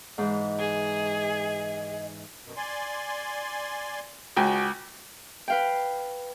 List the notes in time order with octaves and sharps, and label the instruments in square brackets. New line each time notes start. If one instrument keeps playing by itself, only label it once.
[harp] G#2 E3 [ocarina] D#5
[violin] G#4
[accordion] F#2 B2
D5 G#5 C6
[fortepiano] C#2 [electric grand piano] F#4 G5 G#5
[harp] B4 F5 G5